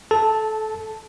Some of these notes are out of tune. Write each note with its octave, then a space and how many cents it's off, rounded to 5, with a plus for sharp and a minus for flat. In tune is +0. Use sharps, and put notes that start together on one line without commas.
A4 -20 A5 +0